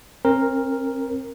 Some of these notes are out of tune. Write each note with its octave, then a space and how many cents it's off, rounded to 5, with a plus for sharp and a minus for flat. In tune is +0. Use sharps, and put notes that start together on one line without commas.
C4 +35 A#4 +0